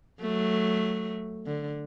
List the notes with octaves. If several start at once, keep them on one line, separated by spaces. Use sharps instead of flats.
F#3 A3
D3